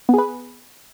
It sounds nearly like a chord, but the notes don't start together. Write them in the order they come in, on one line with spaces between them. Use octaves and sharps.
B3 G#4 B4